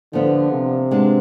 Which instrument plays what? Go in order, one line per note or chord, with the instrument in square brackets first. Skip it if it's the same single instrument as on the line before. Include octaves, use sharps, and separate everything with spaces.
[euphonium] D3 [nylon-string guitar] F3 B3 F4
[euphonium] C3
[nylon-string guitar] G#3 B3 D4